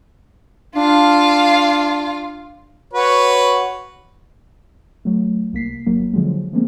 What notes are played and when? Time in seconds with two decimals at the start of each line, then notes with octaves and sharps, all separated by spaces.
0.76 D4 F4 F5
2.93 F#4 B4 C#5
5.05 F#3 A3
5.53 C2 A#3 B6 C7
5.86 G1 F#3 A#3
6.14 D3 F3 F#3 G#3
6.53 F3 G#3 A#3 C4